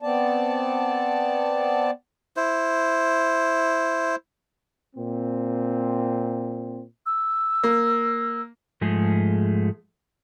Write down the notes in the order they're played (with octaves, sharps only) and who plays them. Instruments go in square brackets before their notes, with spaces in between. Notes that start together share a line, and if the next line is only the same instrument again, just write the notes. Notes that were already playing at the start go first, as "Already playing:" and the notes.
[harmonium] B3 C4 D5 A5
[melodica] E4 C5
[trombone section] A#2 C4
[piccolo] E6
[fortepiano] A#3
[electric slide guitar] G#2 F3 G#3 A3 G#4